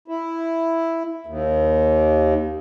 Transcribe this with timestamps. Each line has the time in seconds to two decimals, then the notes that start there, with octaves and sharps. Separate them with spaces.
0.08 E4
1.27 D#2